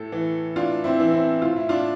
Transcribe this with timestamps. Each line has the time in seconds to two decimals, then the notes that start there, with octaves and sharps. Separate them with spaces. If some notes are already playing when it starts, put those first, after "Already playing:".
Already playing: A2 A4
0.12 E3
0.56 A2 D4 F4
0.84 C4 E4
1.00 E3
1.13 C4 E4
1.42 A2 F4
1.56 E4
1.69 D4 F4